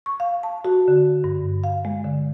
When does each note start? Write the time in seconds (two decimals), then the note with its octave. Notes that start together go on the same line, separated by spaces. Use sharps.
0.06 C#6
0.20 F5
0.43 A5
0.65 F#4
0.88 D3
1.24 G2
1.64 F5
1.85 G#3
2.04 D3